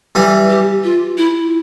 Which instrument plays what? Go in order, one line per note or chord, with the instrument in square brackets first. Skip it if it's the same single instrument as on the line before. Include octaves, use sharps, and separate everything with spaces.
[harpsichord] E3 G3
[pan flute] G4
F4
E4